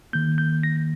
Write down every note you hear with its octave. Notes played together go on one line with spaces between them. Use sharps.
D#3 A#3 G6
G6
A#6